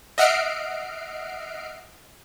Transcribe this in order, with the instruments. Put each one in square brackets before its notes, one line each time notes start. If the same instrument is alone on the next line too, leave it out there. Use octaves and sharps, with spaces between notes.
[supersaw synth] D#5 E5 F#5 F6 C7 D7